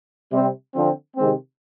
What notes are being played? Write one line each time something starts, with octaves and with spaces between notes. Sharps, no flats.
C3 G3 C4
D3 F3 C4
C3 D#3 G#3 C4